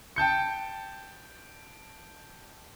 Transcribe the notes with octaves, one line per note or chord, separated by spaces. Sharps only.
G5 A5 G6 C#7